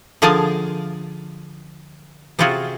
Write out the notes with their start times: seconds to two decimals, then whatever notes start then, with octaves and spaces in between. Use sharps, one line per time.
0.22 D3 F3 G#4 A#4 G#5 A5
2.39 C3 C4 C#4 F4 F#4 G#4